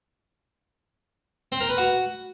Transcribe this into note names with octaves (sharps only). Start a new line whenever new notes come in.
C4
A#4
B4
F#4